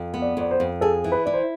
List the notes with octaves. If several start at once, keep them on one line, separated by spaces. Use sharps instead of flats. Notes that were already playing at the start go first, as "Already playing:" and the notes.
Already playing: F2
B3
D5
F2 D5
C5
F2
G#4 A4
E3
B4
E4 D5
C5